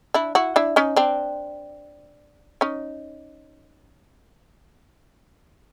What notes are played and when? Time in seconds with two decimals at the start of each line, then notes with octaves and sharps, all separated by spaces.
0.14 D4 E4
0.35 E4 F#4
0.56 D4 E4
0.76 C#4 D#4
0.96 C4 D4
2.61 C#4 D#4